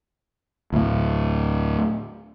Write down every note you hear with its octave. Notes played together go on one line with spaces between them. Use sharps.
D2 A2